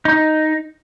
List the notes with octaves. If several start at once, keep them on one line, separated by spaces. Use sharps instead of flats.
D#4